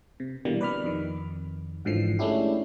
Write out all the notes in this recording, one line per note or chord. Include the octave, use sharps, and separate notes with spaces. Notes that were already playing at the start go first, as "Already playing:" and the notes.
C3
B2 D3 E3 G3 A#3
B4 D5 B5 F6
F2 D#3
G#1 G#2 D3 E3 F3 C7
G#3 A3 C#4 D4 E4 G4